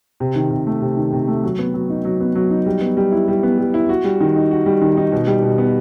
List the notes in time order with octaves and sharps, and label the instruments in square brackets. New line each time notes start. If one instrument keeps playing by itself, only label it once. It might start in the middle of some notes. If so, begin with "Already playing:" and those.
[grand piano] C3
D#3
C3
A3
C3
D#3
C3
A3
F#3
B3
F#3
D#4
F#3
B3
F#3
D#4
G3
B3
G3
E4
G3
B3
G3
E4
F#4
G3
D#3
D#4
F#4
G3
D#3
D#4
B2
G3
B2
B3